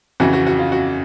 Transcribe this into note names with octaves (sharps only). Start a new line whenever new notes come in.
F2 C#3 E3 F#4
F#4
F#4
F4
F#4